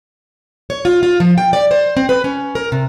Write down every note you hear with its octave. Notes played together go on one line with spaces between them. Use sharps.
C#5
F4
F4
F3
G5
D5
C5
C4
B4
C#4
A#4
C3